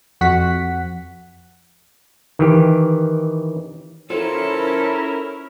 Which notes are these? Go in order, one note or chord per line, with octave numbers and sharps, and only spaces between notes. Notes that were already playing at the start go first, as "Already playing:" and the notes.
F2 F#4 F#5 B6
D#3 E3 G4
C#4 E4 F4 A4 A#4 C5 C#5